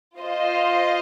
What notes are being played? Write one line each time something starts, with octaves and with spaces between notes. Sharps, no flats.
F4 C5 D#5